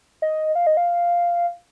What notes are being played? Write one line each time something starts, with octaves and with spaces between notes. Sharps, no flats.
D#5
F5
D#5
F5